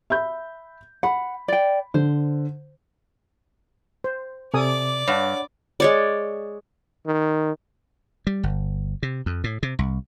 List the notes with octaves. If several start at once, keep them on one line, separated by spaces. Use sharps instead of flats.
E5 B5 G6
F#5 B5
D5 G5
D3 C5
C5
C3 A4 D5 G#5 D6 D#6
G2 C#5 F#5
G#3 C#5 D5
D#3
G3
G1
C3
F2
A2
C3
C2